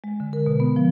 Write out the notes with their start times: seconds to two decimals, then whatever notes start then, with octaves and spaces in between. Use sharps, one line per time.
0.04 G#3
0.20 D3
0.33 A#4
0.46 B2
0.60 B3
0.76 F3